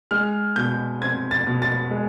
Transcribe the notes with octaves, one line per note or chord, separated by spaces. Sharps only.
G#3 F6
B2 G6
C4 G#6
A6
B2
A6
G#3